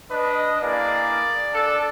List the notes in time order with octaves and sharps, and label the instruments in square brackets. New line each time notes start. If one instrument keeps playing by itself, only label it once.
[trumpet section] D4 D#5 [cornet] B4
[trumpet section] A#3 E4 G#4 [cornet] D5
[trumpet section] D4 A4